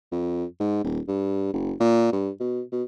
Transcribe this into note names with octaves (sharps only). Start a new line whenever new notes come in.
F2
G#2
D#1
G2
F#1
A#2
G2
B2
B2